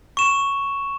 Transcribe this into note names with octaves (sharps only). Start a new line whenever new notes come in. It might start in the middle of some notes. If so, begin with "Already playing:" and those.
C#6 E7